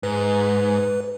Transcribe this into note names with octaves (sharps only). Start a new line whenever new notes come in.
G#2 B4